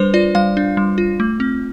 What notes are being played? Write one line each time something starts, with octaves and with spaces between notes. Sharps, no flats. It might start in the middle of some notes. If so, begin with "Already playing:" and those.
Already playing: G3 D4 B4 C5
F4 D5
G3 F5
D4
G3
F4
A3
C4